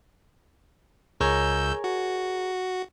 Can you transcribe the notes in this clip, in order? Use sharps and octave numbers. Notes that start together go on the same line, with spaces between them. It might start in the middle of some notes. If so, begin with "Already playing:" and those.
C#2 G#4 A#4 C#5 E6 G6
F#4